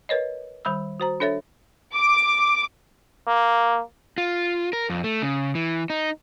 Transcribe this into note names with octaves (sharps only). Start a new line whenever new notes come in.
A#4 B4 C#5 D#5
D#3 G3 B5 E6
F#4 C5 A#5
D4 A4 C#5 E5 A6
D6
A#3
F4
A#4
F2
A3
C#3
E3
D#4